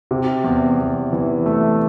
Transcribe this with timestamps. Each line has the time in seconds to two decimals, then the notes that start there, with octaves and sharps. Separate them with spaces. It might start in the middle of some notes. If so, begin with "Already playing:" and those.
0.11 C3
0.44 E2
0.78 E2
1.12 E3
1.46 A3